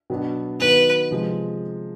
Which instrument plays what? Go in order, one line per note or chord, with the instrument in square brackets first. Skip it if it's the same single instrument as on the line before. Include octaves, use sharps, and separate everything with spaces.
[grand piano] B2 F#3 B3 D4 F#4
[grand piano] D#3 F#3 B3 [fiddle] B4
[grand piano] C3 F3 G#3